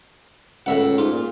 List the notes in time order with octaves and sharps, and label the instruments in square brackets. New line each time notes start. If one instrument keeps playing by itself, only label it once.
[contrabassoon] C#2 [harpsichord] A2 E5 F#5
[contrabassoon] G#2 [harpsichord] F4
[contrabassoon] A#2